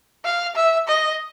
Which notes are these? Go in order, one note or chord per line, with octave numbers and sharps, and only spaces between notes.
F5
E5
D#5